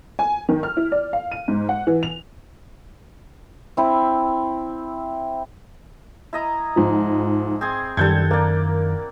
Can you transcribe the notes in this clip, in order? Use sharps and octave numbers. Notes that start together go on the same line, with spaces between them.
G#5
D#3
F6
E4
D5
F5
D#7
G#2
F#5
E3
F7
C4 E4
E4 D#5 A#5
G#2 F3
C4 G#4 G#5
F#2 D#3 G3 A4 F#5 G6 G#6
A#3 A#4 D5